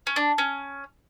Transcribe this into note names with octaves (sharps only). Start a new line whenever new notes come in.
C#4
D4
C#4